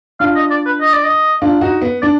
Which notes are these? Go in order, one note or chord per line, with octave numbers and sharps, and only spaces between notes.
D4 F4 F5
D#5
D5
B4
D#5
D5
D#5
D4 F4
D#4 F#4
B3
D4 D5